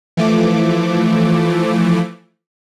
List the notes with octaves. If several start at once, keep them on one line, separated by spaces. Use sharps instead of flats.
E3 F3 A3 D6